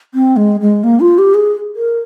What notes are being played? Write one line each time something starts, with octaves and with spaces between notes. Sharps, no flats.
C4
G#3
G#3
A#3
F4
G4
G#4
A#4